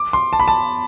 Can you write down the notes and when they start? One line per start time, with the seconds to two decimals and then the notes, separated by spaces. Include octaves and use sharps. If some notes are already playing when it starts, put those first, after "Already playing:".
Already playing: D6
0.13 C6
0.33 A5
0.40 B5
0.48 A5